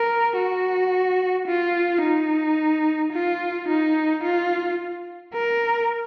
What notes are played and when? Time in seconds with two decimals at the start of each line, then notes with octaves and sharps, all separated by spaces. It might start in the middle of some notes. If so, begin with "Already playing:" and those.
Already playing: A#4
0.37 F#4
1.47 F4
2.02 D#4
3.12 F4
3.68 D#4
4.23 F4
5.33 A#4